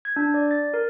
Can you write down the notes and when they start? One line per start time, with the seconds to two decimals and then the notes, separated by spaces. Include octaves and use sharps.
0.05 G#6
0.16 D4
0.34 D5
0.51 A6
0.74 A#4